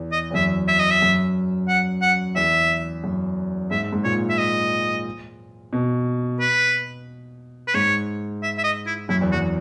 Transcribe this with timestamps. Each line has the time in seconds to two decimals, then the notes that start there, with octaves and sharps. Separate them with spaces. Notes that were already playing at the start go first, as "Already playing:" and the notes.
Already playing: E2
0.12 D#5
0.31 E2
0.34 F#2 E5
0.68 E5
0.79 D#5
0.90 E5
1.02 F#2
1.68 F#5
2.02 F#5
2.36 E2 E5
3.04 F#2
3.71 G#2 E5
3.93 G#2
4.04 A#2 C#5
4.30 E5
4.38 D#5
5.73 B2
6.40 B4
7.67 B4
7.74 G#2 C#5
8.42 E5
8.58 E5
8.64 D#5
8.87 E4
9.09 F#2 E4
9.21 E2
9.32 F#2 F#4